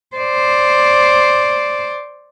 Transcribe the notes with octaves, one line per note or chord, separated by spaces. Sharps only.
C5 D5